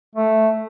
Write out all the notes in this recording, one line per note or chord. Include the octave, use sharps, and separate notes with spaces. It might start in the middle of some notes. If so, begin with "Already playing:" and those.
A3